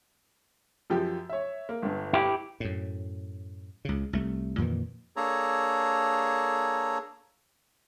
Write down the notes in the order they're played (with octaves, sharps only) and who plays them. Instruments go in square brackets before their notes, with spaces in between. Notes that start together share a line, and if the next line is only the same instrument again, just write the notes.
[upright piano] F#2 F3 G4
C#5 E5
A#3
G1 G2
[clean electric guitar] E4 G4
[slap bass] F#2 A2
C#2 C#3
C2 A3
F2 A#2 D#3 E3
[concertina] A#3 D4 G#4 A4 C#5 A#5